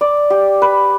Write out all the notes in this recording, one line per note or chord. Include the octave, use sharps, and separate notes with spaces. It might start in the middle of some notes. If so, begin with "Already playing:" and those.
D5
G4
B4